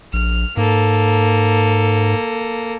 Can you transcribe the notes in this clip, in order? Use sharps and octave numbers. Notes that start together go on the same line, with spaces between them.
A#1 F6
G#2 A#3 A4